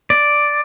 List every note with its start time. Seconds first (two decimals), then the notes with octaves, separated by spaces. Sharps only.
0.10 D5